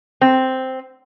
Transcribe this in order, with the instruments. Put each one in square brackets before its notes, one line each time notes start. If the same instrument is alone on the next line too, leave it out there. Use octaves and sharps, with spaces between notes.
[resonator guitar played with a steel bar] C4